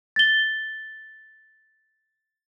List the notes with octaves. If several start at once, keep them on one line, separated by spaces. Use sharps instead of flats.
A6 G7